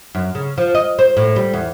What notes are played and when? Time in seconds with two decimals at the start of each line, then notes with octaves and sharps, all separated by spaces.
0.15 F#2
0.35 C#3
0.58 F3
0.75 D#5
0.99 C5
1.17 A2
1.36 G3
1.53 E2